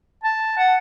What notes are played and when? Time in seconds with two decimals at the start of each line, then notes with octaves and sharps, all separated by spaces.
0.24 A5
0.58 F#5